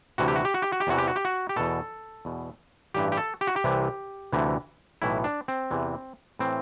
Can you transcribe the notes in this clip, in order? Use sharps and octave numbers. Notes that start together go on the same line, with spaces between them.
D2 C3 E3 F#4
G4
F#4
G4
F#4
G4
F#4
G4
E2 C3 E3 F#4
G4
F#4
G4
F#4
G4
E2 B2 A4
E2 B2
A1 G2 E3 G4
G4
A4
G4
F#4
G4
C2 C3 E3
D2 C3 E3
B1 A2 E3 E4
D4
C4
E2 C3 E3
A2 E3 C4